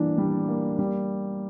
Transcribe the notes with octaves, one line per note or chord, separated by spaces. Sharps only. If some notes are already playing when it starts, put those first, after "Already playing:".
Already playing: E3 G3 A#3 D4
G3
A#3
G3